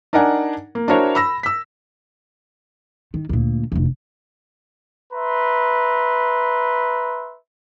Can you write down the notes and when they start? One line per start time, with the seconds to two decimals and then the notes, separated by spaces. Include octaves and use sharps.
0.13 D4 D#4 A#4 D5 F#5 G#5
0.75 A#3
0.88 D4 E4 F#4 A#4 C5 C#5
1.15 B5 E6 A#6
1.43 E6 B6
3.14 D#3
3.29 D2 A#2
3.72 F1 D2
5.13 B4 E5 A#5 C6